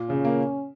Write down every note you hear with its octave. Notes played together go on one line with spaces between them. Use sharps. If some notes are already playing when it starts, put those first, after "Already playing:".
Already playing: A#2
C#3 C#4
A#3